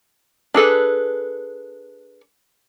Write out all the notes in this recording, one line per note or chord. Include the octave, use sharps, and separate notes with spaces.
D4 G#4 A4 B4